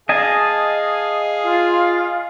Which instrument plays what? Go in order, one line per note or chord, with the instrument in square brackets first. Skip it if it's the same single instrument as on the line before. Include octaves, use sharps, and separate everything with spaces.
[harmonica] G#4 F5 [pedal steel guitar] D#5 G#5 A5
[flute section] F4